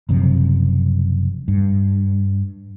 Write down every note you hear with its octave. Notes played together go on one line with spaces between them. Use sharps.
F#1 F#2 C3 F3
G2